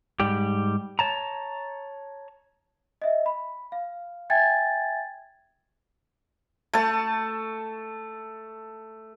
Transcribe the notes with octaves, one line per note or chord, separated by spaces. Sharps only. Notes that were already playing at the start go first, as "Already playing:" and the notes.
G#2 G3 G4
C#5 A5 A#5
D#5 E5
B5
F5
E5 G5 G#5 G#6 A6
A3 A5